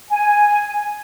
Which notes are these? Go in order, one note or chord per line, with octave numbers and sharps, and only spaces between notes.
G#5